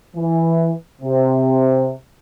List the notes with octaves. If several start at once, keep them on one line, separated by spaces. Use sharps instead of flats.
E3
C3